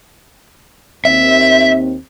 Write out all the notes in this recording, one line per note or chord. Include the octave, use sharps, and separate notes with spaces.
D#2 C4 E5